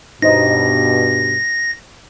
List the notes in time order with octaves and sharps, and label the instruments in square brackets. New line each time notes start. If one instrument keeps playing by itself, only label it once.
[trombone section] G2 B2 [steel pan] D#4 C5 D#5 [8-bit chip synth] A#6